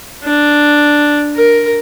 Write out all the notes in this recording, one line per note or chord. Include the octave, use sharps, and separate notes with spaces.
D4
A#4